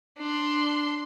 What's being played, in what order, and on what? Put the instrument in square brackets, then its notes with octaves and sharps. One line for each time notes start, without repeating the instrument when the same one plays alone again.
[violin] D4 C6